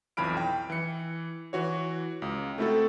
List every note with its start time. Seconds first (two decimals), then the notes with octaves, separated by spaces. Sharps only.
0.17 B1 F2 E3 B5 F6 D7
0.37 G5
0.70 E3 C#7
1.53 E3 F#4 C#5
2.22 C#2
2.58 A3 C4 E4 F#4 A4